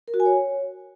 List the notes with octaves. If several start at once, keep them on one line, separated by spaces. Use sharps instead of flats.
A#4
F#4
G#5
C#5